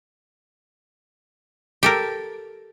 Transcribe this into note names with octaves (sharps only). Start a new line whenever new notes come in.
G4 A4 A#4